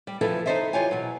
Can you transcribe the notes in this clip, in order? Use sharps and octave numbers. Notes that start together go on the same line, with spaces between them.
G3
E3 F3 E4 A4 B4
D#4 E4 A4 C5 D#5 E5
E3 F4 G4 C#5 G#5
B2 F#3